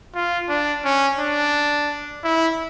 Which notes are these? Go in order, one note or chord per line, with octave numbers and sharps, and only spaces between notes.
F4
D4
C#4
D4
E4